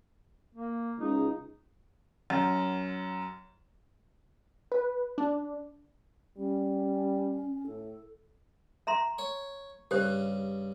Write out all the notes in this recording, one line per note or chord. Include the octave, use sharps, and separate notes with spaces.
A#3
C#2 D#4
F#2
B4
D4
G3 C#4
A2 A4
E5 A#5 C6
C#5
G2 C#3 G4 C5